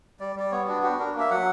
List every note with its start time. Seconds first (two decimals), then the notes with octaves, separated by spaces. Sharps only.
0.20 G3 D5
0.36 G3 D5
0.52 B3 C#5
0.68 D4 F#4
0.83 F#4 G4
0.99 D4 A#4
1.15 A#3 E5
1.31 F#3 F#5